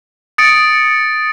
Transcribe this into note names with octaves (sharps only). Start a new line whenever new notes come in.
D#6 A6 C#7 D7